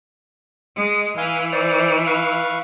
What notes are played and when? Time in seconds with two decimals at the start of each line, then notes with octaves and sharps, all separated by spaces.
0.76 G#3
1.18 E3 F5 G#5 C6
1.52 C5 D5
2.07 B4 F5 C#6